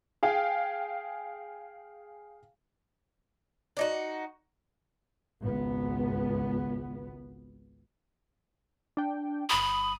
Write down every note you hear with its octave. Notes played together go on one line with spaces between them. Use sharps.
G#4 F5 G5
D4 D#4 F#4
G#1 C#2 B3
D4 G5
G1 B5 D#6